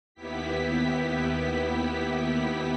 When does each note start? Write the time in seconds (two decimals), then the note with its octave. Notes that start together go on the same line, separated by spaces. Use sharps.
0.14 D#2 B3 E4 G4 B6